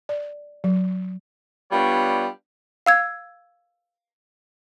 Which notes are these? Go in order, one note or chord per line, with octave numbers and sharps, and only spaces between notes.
D5
F#3
G3 B3 D4 F4 C#5
F5 E6 G#6